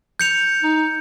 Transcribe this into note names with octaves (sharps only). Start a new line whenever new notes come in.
G6 C#7 F7
D#4